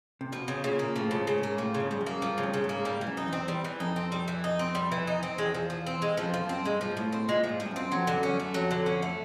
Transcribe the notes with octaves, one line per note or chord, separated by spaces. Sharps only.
C3
B2 F3
C#3
A#2 C#3
A#2 A#3
A2 F3
C#3
G#2
C#3
G#2
A#3
A2 F3
C#3
G#2
G2 C#3
F#2
A#3
G2 F3
C#3
G2
C#3
G#2
A#3
G#2 G3
E3
F#2
D#4
E2 C4
G3
E3
F2 D#4
C4
G3
E3
D#4
C4
G3
E3
D#4
C4
E2 G#3
F3
F3
C4
G#3
F2 F3
F3
F#2
C4
G2 G#3
F3
G#2
A2 F3
C4
A#2 G#3
F3
G#2
F3
G2
F#2 C4
F2 F#3
D3
F#2
C#4
F#2
A3
F2 F#3
D3
C#4
A3